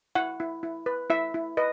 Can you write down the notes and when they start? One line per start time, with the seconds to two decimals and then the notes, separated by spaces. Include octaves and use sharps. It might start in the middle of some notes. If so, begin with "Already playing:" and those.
0.15 E4 F#5
0.40 E4
0.63 E4
0.86 B4
1.10 E4 E5
1.34 E4
1.57 B4 D#5